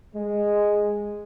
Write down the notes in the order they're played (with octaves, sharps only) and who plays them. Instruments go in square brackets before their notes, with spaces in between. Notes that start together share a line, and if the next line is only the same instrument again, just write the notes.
[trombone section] G#3